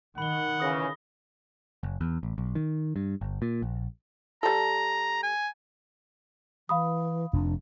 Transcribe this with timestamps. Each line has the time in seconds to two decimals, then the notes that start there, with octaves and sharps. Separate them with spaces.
0.18 D#3 F#5 B5 G7
0.60 C#3 E3 D#6 A#6
1.83 F#1
2.01 E2
2.23 A1
2.38 B1
2.55 D#3
2.96 G2
3.21 G1
3.42 A#2
3.62 A#1
4.43 G3 A4 A#5
5.23 G#5
6.69 E3 F5 B5 D#6
7.33 F1 F2 D4